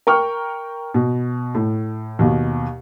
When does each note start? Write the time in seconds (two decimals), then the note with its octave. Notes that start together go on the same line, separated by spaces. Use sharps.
0.07 A#4 G5 C#6 F6
0.94 B2
1.55 A2
2.19 D#2 B2